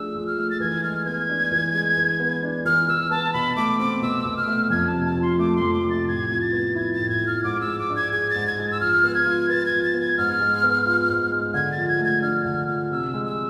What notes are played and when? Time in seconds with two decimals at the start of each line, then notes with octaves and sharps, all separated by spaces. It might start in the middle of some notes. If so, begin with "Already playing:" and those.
Already playing: F3 A3 D4 G#4 E6
0.15 F3
0.27 F6
0.38 A3
0.50 A6
0.60 E3 G#6
0.83 G#3 F6
1.06 B3 G#6
1.29 D4
1.52 E3
1.74 G#3
1.97 E3
2.20 B3
2.43 D4
2.65 E3 F6
2.88 E3 E6
3.11 B3 A5
3.33 B2 B5
3.56 A3 D6
3.79 C4 D6
4.02 B2 E6
4.25 B2
4.37 F6
4.47 A3
4.70 F2 G#6
4.87 A5
4.94 C3
5.05 A5
5.16 F3
5.22 C6
5.39 A3 D6
5.56 C6
5.62 F2
5.74 D6
5.85 C3
5.90 A6
6.08 A2 G#6
6.30 F3
6.41 A6
6.53 B3
6.75 E4 G#6
6.93 A6
6.99 A2
7.09 G#6
7.21 F3
7.27 F6
7.44 G#2 D6
7.61 E6
7.66 G#3
7.79 D6
7.90 D4
7.96 G#6
8.12 G#4 G#6
8.30 A6
8.35 G#2
8.47 G#6
8.58 G#3
8.71 E6
8.80 F3 F6
9.04 B3
9.14 G#6
9.26 F4
9.49 B4 A6
9.66 G#6
9.72 F3
9.84 A6
9.94 B3
10.01 G#6
10.18 G#2 F6
10.40 G#3
10.63 B3
10.85 F4
11.09 G#2
11.32 G#3
11.54 D3 G#6
11.72 A6
11.77 F3
11.89 G#6
11.99 A3
12.05 G#6
12.22 D4 F6
12.45 D3 F6
12.68 F3 F6
12.91 C3 E6
13.14 G#3
13.26 E6